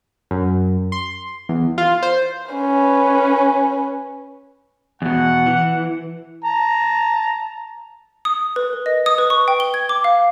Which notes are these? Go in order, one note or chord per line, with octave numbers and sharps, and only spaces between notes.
F#2
C6
E2
F4
C5
C#4 B4
E2 B2 F#5
E3
A5 A#5
D#6
B4
A#4
D#5
D#6
B4
C#6
G5
G7
G#6
D6
F5